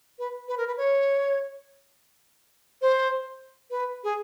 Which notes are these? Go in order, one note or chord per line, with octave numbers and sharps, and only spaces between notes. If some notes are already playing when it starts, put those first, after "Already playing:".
B4
B4
A#4
B4
C#5
C5
B4
G#4